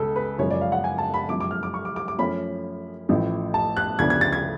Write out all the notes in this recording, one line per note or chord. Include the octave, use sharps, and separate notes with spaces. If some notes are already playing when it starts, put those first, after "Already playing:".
Already playing: C#2 C#3 G#3 A4
B4
F#1 F#2 C#3 F3 G#3 C#5
D5
F5
F#5
G#5
A5
B5
F#2 F3 G#3 D6
D6
F6
D6
C#6
D6
D6
D6
F#2 F3 A3 C#4 B5
A1 A2 F3
A5
F#6
D2 C#3 F3 B3 D4 G#6
G#6
A6
G#6